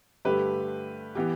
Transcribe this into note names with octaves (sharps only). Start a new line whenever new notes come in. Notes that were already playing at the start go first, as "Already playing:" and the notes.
G2 D3 A3 G4 B4
E3 B3 G4